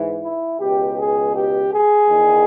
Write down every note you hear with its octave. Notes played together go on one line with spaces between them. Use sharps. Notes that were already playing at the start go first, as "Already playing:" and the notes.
Already playing: G#2 E3
E4
C#2 B2 G4
G#4
G4
G#4
E2 D#3